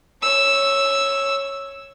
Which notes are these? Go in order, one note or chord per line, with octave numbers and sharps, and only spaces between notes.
C#5 E6